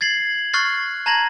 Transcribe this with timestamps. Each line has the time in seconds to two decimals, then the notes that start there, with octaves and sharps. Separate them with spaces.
0.01 G#6 A6 C7 F#7
0.53 C#6 F6 F#6 A6 C7
1.06 A5 A#5 G#6 A#6 F#7